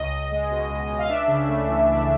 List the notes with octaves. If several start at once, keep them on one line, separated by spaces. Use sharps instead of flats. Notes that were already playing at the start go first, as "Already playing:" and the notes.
Already playing: C#2 D#5
C#2
G#3
B2
C#2
C#2
F5
D4 E5
C#3
A3
E3
D4